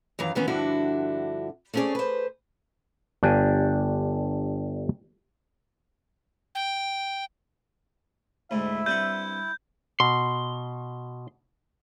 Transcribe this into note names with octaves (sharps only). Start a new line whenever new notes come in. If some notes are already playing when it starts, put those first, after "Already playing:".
F#2 D#3 E3 F5 A#5
D#3 E3 A#3 B3 C#4
G2 D3 F3 D4 E4 F#4
A3 C4 C#4 F4 G#4 D5
B4 C5
G1 D4 G4 F5 G#5
G5
D2 G#2 E4 E5
G2 C4 F#5 G6
B2 C6